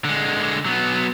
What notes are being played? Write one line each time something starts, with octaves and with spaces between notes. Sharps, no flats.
D3 G#3
F#3 B3